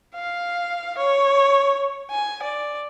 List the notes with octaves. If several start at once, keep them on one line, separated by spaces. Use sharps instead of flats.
F5
C#5
G#5
D5